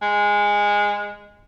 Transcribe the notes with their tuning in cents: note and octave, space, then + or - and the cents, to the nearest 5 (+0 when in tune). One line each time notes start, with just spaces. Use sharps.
G#3 -15